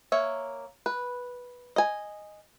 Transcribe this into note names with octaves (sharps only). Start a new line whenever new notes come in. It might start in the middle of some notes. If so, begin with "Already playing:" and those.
A#3 C#5 E5
B4
D#5 G#5